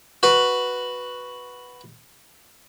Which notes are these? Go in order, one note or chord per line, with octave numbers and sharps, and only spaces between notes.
F#4 B4